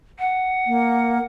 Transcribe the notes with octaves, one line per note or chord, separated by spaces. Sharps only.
F#5
A#3